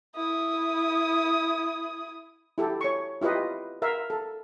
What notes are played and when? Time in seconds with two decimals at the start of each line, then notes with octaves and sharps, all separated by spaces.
0.16 E4 D#6
2.58 E4 G4 A4
2.81 C#5 C#6
3.22 E4 F4 G4 B4 D#5
3.82 A#4 E5 F5
4.10 A4